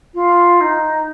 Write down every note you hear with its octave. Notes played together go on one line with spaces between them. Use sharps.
F4
D#4